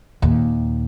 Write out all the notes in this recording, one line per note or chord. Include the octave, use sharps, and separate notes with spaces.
D#2 A#2